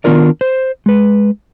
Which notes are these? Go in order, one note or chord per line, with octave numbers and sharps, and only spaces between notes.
D#3 B3 D4 F4 A#4 D5
C5
G#3 B4